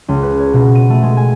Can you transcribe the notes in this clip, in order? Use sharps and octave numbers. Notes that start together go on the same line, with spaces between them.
C#2
B4
C#5
B2
D#7
A3
G#3
G#5